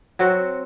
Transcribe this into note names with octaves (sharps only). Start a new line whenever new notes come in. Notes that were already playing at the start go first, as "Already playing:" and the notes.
F#3 C4 F#4